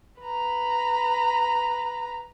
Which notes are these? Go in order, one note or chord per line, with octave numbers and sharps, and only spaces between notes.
B4 A#5